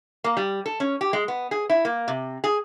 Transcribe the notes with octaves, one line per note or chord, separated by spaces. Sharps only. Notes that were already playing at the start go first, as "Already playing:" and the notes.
A#3
G3
A4
C#4
G4
G#3
B3
G#4
E4
A#3
C3
G#4